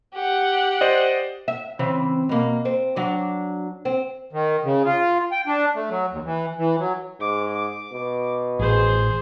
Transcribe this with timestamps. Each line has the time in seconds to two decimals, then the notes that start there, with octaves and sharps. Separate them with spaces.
0.14 G4 F#5
0.81 C5 D5 D#5
1.48 E5
1.79 C#3 E3 C4
2.29 B2 A#3
2.65 C4
2.96 F#3 D4
3.85 C4
4.33 D#3
4.64 C#3
4.85 F4
5.32 G5
5.47 D4
5.75 A3
5.90 F#3
6.12 D#2
6.25 E3
6.58 E3
6.79 F#3
7.20 G#2 D6
7.93 B2
8.59 A1 G#4 C5